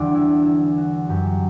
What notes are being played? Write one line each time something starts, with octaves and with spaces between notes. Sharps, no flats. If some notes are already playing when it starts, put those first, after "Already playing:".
Already playing: E2 D3 G3 D4
E4
E4
F#4
F#2 F#3 G4